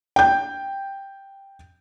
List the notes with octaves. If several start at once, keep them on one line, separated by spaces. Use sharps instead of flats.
G5 G6